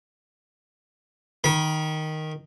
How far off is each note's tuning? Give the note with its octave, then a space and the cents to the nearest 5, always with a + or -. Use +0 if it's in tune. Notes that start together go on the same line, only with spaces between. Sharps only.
D#3 +0 B5 -30